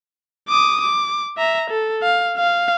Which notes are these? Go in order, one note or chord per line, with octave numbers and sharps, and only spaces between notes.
D6 D#6
D6
E5 A#5
A4
F5
F5